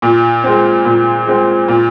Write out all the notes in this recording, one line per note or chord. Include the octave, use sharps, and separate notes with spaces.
A#2
G#3 C4
A#2
G#3 C4
A#2